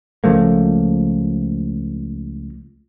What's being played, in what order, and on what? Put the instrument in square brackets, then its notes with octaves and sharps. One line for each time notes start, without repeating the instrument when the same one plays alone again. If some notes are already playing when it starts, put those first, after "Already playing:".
[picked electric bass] C#2 F3 A3 A#3